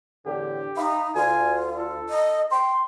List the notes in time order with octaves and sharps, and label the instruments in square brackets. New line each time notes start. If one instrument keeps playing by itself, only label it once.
[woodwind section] E2 A2 D3 [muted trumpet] G4
[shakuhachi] D#4 [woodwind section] E5 F5 B5
[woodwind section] D2 [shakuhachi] F4 [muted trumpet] G#5
[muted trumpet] A4
[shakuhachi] D#5
[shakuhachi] G5 [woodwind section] C6